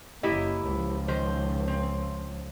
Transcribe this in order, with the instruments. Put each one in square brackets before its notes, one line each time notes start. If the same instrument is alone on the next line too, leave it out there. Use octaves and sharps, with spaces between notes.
[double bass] F#1 A#3 [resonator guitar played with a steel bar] E4 G4 D#5
[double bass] C#2 F3
[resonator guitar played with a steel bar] D#3 C5
C4